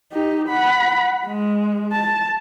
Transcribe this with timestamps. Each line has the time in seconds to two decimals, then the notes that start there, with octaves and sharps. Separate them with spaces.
0.12 D#4 G4
0.49 F#5 B5
1.27 G#3
1.92 A5